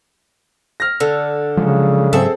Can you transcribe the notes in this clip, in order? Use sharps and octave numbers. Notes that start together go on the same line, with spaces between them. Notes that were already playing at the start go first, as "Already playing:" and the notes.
F6 A#6
D3 A4
C#3 F3 F#3 G#3
G#2 F#3 C4 G#4 A4 E5